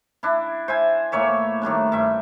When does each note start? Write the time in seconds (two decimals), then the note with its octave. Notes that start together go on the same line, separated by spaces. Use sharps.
0.23 D4 E4
0.68 C5 E5 G#5
1.12 A2 A#3 C#5 E5
1.62 A2 D#3 G3 D4
1.92 G2 E5